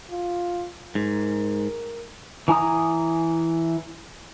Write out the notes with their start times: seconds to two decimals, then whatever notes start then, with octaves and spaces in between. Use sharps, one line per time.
0.10 F4
0.95 G#2 A#4
2.48 E3 G#5 A#5 D#6